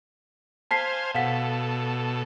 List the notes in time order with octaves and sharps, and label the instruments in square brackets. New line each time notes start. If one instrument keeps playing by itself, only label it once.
[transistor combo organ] C5 F5 G#5 [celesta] A5 B6 C7
[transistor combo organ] B2 A4 [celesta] F5 F#5 B6